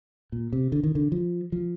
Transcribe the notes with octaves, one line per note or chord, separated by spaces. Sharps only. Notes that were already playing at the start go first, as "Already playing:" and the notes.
A#2
C3
D3
D#3
D3
F3
F3